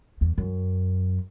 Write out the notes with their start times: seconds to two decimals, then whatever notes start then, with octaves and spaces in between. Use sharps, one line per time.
0.21 E2
0.38 F#2